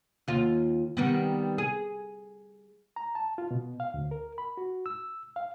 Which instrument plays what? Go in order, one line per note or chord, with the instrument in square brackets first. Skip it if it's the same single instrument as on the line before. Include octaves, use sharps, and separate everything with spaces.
[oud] D#2 F4
D#3 G3 B3
G#4
[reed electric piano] A#5
A5
F4
B2
F5
D2
A#4
B5
F#4
E6
F5